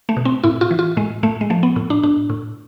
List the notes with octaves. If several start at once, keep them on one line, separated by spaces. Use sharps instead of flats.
A3
B2
C4
A2 E4
F4
E3
F4
A2 G#3
A2 A3
G#3
F3 A3
B3
A2
D4
A2 D4
A2